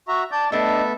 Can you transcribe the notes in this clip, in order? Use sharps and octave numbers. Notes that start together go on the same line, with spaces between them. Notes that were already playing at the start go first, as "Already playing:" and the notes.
F#4 E5 A#5 C#6
D5 A5 G6
G3 A3 B3 D4 A4 D#5 E5